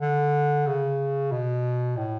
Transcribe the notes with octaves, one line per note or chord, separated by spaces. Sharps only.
D3
C#3
B2
A2